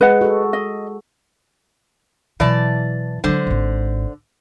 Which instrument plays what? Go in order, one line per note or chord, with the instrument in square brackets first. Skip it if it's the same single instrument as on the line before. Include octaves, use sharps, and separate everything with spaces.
[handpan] G#3 [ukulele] B4 D#5 F#5
[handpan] F#4 A4
[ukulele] D#5
[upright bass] B2 F#3 [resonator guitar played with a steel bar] E3 D5 A5
[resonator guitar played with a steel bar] D3 C5 [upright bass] F#3 G#3
[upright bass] G#1 G#2